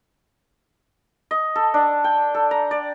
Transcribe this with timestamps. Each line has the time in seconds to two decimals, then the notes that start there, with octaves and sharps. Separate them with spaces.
1.31 D#5
1.56 A4
1.74 D4
2.04 G5
2.34 A4
2.51 A#5
2.71 D5